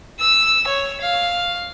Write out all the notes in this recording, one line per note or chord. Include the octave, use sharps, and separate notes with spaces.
E6
C#5
F5